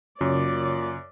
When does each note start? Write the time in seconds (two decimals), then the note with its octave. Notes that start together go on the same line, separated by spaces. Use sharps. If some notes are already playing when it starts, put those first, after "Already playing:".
0.21 F#2 A#2 C#3 C#5 D5